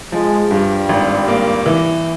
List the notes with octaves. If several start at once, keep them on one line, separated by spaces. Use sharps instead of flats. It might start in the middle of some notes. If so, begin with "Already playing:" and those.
F3 G#3
G2 G3
G#1
A#3
E3